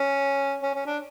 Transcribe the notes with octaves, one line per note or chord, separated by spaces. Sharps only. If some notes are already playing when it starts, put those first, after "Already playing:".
Already playing: C#4
C#4
C#4
D4